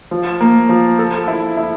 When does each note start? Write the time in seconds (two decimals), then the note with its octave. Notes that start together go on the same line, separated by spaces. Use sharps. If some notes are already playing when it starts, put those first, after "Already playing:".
0.11 F3
0.41 A#3
0.69 F3
0.99 A4
1.28 E4
1.57 E4